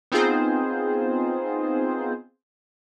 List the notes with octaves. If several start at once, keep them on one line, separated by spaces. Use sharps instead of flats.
B3 C4 D#4 F4 G#4 C5